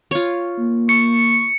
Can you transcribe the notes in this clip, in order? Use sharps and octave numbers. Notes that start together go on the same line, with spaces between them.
F4 C#5
A#3
C#6 C#7